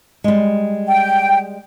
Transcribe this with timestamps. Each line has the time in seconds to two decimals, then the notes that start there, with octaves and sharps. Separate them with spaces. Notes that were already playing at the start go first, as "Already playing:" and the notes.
0.24 G3 G#3
0.88 G5